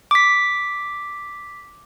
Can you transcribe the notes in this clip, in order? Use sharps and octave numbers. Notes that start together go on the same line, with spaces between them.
D6 B6